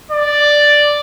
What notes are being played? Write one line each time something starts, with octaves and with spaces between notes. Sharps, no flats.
D5